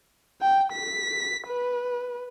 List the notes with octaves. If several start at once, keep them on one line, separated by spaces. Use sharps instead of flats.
G5
B6
B4